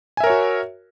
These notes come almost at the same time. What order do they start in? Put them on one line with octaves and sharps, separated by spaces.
G#5 E5 A#4 C#5 F#4